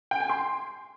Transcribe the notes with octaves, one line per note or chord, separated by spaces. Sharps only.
G5
G#5
C6